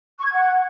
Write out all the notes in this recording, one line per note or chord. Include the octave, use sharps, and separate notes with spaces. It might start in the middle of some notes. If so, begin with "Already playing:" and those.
C#6
G#6
F#5